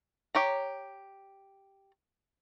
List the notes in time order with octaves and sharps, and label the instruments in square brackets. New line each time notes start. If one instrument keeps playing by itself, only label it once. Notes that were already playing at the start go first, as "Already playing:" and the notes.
[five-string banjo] G4 C#5 A#5